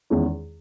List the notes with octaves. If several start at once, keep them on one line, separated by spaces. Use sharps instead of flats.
E2 D#3 G#3 C#4 E4